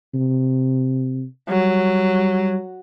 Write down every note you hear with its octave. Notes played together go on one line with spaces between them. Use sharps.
C3
F#3 G3